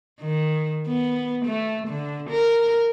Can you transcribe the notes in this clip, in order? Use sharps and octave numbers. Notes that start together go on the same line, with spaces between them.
D#3
B3
A3
D3
A#4